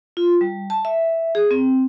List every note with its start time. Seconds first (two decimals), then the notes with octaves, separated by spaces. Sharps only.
0.17 F4
0.41 G3
0.70 A5
0.85 E5
1.35 G#4
1.51 C4